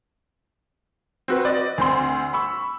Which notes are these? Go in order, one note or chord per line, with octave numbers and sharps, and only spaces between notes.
C4 F#4 B4
D5 D#5
D2 C4 C6
B5 C#6 E6